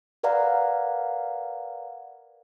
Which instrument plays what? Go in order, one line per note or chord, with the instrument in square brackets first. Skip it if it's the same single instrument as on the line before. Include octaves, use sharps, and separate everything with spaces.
[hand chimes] A#4 B4 D5 F5 F#5 A#5